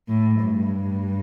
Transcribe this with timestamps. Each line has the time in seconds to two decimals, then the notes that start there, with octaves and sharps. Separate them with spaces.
0.08 A2
0.42 G2